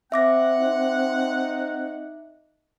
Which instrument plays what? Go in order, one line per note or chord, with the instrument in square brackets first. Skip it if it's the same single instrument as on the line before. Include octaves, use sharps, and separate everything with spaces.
[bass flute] C4 [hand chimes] E5 D6 A#6 [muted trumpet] F#5
[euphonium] D#4